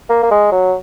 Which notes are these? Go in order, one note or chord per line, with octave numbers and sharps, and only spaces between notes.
A#3
A#3
G#3
F#3